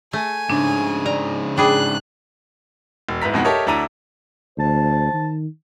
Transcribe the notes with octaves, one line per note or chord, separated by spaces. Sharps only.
A3 G#5
G#2 C#3 D4
D5 A#5
D4 G#4 G5 B5 D6 F#6
E1
G#2 E4 B4 A#5 B6
D1 F2 B2 G#3 D#4 F#4
G4 A4 A#4 C#5 D#5 E5
D2 D4 E4 A4 A#5 D#7
D2 C5 A5
D#3